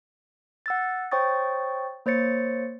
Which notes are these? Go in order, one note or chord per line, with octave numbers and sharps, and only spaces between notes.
F#5 E6 A6
C5 C#5 G5 C#6 D#6 A6
A#3 C5 C#5 A6 C#7